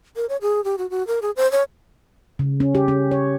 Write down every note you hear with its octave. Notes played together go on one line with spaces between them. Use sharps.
A#4
C#5
G#4
G4
F#4
F#4
A#4
G#4
C5
C#5
C#3
C#4
G4
C#4
C#5